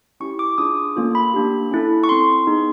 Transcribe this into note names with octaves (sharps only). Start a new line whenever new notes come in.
C#4 E4 G4 C#6
D6
D4 F4 G#4 D#6
A#3 C#4 F4 A4
B5
A#3 D4 G4
C#4 E4 A4
C#6
C4 E4 A4 C6
B3 D#4 G#4